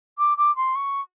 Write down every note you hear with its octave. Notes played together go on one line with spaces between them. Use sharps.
D6
D6
C6
C#6